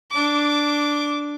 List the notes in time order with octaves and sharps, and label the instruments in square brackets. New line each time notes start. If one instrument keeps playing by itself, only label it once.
[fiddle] D4 D6